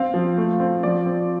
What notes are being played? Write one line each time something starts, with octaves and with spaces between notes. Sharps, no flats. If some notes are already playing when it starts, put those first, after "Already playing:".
Already playing: C4 F5
F3
A3
C4
F3 D5
C4